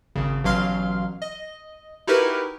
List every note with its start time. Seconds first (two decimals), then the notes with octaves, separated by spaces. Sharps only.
0.15 G#1 C#3
0.44 A1 B2 F#3 F5 C6 F6
1.22 D#5
2.07 D#4 E4 F#4 G4 A#4 B4